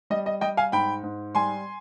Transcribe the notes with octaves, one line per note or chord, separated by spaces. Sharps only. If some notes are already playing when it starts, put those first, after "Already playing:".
G3 D#5
D#5
G3 D#5 G5
F5 G#5
G#2 G5 B5
G#2
G3 G#5 C6